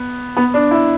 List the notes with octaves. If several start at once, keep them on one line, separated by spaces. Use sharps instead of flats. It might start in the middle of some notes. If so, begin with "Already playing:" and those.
Already playing: B3
B3
D4
E4